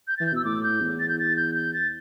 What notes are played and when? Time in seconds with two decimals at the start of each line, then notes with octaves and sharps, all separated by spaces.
0.08 G6
0.17 E3 A6
0.27 G6
0.33 B2 E6
0.45 A2 D6
0.63 G6
0.81 E2
1.00 A6
1.09 G6
1.19 A6
1.36 G6
1.55 G6
1.74 A6